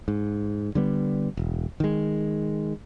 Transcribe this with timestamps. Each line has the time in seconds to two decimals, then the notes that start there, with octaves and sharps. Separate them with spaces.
0.08 G#2
0.75 D3 G3 B3
1.37 E1
1.80 D#3 G#3